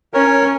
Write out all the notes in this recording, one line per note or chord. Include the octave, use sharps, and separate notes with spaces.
C#4 A#4 C#5